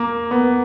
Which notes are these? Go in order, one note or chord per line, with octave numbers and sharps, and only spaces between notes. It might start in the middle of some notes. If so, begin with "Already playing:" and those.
Already playing: A#3
B3